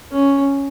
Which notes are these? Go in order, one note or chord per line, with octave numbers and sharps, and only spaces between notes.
C#4